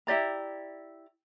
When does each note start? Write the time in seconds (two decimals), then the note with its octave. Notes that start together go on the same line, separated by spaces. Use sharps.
0.07 E4 G4 D5 A#5